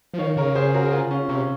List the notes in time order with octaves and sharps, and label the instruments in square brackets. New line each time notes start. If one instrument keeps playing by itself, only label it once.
[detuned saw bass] F3
[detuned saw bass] D#3 [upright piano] C#5 F5
[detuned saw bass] C#3 [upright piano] A#4 C#5
[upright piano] G#4 C5
F#4 A#4
A#4
F4 G#4
C#4 F4
[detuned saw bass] C3 [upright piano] C#4